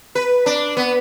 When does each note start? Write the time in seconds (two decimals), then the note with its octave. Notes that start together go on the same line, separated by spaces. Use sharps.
0.15 B4
0.46 D4
0.77 B3